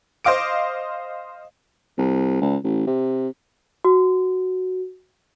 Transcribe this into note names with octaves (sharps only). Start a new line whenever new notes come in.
C5 D#5 F5 D6 D7
C2
C#2
A1
C3
F#4